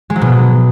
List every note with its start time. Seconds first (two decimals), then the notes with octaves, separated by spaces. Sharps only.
0.10 G#3
0.16 F#3
0.21 B2